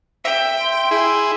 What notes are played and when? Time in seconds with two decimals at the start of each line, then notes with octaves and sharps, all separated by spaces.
0.25 E5 G5
0.61 C6
0.91 E4 G#4